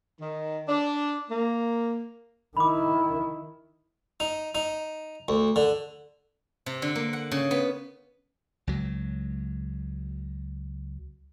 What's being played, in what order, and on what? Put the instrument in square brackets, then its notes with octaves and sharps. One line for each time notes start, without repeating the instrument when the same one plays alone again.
[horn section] D#3
D4
A#3
[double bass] D#3 E4 [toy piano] B5 D6
[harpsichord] D#4
D#4
D2
D3
[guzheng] C3
D3
A#3
F#5
C#3
B3
[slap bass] C#2 F#3